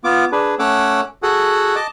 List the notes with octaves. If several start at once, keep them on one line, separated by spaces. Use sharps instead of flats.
B3 F4 D6
D4 G#4 B4
A3 C#4 C#5 F#5 D6 E6
F#4 G#4 A4 F#5
D#5 A5 D6